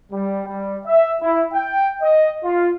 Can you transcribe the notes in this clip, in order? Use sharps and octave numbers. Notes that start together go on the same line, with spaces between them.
G3
G3
E5
E4
G5
D#5
F4